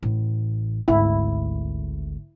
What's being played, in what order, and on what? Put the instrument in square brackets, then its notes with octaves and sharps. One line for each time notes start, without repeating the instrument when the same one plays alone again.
[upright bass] A1
[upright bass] G#1 D2 [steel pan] E4